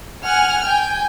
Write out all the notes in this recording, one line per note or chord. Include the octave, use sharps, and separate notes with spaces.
F#5 G#5 F6
G5 G#5